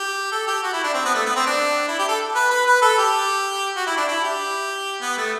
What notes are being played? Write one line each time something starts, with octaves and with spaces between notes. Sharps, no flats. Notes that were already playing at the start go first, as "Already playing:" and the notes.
Already playing: G4
A4
G4
F#4
E4
D4
C4
B3
A3
B3
C4
D4
E4
G4
A4
B4
B4
B4
A4
G4
F#4
E4
D4
E4
G4
B3
A3